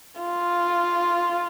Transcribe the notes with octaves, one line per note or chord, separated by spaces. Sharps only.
F4